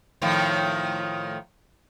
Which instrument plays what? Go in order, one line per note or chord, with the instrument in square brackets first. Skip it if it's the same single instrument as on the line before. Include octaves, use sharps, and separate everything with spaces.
[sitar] A2 D#3 F3